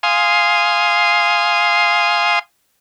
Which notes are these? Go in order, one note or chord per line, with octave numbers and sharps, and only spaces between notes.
F5 G#5 C6 D#6